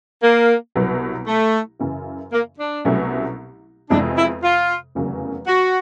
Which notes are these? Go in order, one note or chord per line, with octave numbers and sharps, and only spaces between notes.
A#3
C2 B2 F#3 B3
A3
F#2 C#3 E3
A#3
D4
C2 B2 F#3 A3 C#4
F2 C3 E3 G#3 B3 D4
E4
F4
F1 E2 C#3 F#3 A#3
F#4